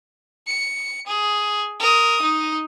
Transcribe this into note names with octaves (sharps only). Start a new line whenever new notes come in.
C#7
G#4
A#4 D#6
D#4